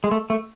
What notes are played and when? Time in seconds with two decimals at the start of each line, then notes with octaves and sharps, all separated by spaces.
0.04 G#3
0.11 A3
0.30 A3